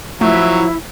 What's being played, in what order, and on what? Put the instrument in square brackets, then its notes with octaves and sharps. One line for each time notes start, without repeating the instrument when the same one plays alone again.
[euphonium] F3 [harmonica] F#3 E5 [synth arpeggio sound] A3 [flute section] E4